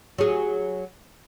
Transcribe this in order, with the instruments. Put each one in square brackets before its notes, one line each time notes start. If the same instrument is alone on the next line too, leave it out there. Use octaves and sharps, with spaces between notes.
[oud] F#3 G#4